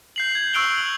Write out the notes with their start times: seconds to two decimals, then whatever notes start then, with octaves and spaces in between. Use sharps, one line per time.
0.16 G6 C7 F#7
0.35 G#6
0.53 C#6 E6 F#6 D7 F7 G7
0.78 F#7